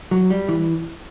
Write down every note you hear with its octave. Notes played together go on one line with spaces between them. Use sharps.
F#3
G3
E3